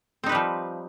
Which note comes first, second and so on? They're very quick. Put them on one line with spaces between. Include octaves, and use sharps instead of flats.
C4 D#4 B4 G3 F3